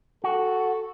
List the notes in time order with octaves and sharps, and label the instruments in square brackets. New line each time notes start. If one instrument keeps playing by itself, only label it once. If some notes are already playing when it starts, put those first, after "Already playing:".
[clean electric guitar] F#4 [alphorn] A4